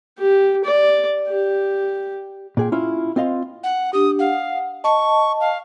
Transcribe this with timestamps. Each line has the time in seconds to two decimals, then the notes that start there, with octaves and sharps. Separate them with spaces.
0.18 G4
0.64 D5
1.28 G4
2.57 A#2 G#4 G5
2.72 C#4 E4 F4
3.16 C4 F4 D#5 F5 C6
3.63 F#5
3.93 D4 G4 D#6
4.19 F5 F#5
4.84 D#5 A5 C#6
5.40 F5